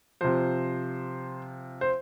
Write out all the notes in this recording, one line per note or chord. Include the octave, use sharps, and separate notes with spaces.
C3 F3 C5
C5